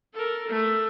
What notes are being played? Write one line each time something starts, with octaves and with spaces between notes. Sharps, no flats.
A4 A#4
A3